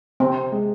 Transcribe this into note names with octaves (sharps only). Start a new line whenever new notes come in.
C3 C4
G#3